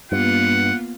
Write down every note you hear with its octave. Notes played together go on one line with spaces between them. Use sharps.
G2 A#3 B3 F4 F#5